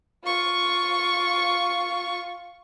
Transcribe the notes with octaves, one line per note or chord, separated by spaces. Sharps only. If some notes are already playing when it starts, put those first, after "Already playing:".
F4 C#6